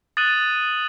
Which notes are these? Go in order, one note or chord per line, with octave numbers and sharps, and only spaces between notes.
D#6 F#6 A6 D#7 F#7